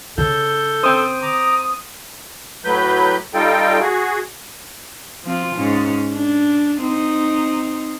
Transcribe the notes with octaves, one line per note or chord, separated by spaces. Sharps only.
C#3 A4 G6
C4 C5 D#6
A#5 D6
A2 F#3 B4 G6
G3 D#4 F4 A4 G5
F#4 G#4
F3 C4 F4
G#2 C#4
D4
C4 D#4